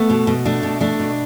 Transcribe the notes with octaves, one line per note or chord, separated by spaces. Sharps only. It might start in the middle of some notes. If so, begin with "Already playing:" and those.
Already playing: A3 B3
B2
B2
A3 D4
B2
A3 D4
B2